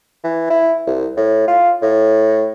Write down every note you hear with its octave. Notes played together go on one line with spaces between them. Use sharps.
E3
E4
C2
A2
F4
A2